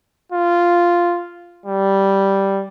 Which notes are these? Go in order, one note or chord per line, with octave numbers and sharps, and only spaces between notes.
F4
G3